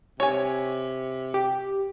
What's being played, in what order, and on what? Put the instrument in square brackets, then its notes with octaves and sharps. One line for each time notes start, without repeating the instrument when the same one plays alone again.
[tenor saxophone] C3 [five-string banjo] C#5 G#5
[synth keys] G4